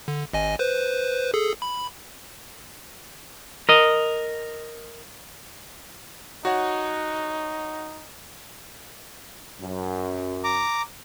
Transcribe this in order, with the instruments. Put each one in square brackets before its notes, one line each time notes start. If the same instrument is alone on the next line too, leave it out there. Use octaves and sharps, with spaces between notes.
[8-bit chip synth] D3
G#1 D#5 G#5
B4 C5
G#4 A4
B5
[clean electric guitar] A#4 D#5
[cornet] D#4 [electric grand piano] F#4 C#5 F#5
[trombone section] F#2
[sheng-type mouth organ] A#5 D6